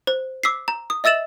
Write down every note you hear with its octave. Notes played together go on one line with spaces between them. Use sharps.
C5
D6 E6 B6 C7
A#5
D#6
D#5 E5 E6 A6 E7 F#7